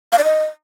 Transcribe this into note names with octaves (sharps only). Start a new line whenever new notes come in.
F5
D5
D#5